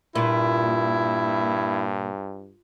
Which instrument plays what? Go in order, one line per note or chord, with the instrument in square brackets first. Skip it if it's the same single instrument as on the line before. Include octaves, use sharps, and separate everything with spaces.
[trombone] G2 [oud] A#2 [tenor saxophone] E4